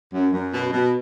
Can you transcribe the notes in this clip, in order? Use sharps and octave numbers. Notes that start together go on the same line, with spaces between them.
F#2
F#2
B2
B2